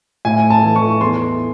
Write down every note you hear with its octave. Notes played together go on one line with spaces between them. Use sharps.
A2 G#5
A5
E3
C#6
E2 C6